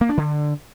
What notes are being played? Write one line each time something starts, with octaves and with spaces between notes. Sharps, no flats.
A#3
D4
D3